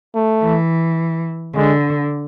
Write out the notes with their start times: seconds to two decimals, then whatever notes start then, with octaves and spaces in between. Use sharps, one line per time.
0.15 A3
0.43 E3
1.55 D3 G#3